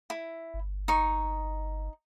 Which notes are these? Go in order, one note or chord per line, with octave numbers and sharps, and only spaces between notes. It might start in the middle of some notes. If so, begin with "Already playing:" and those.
E4
G1
D#4 C#6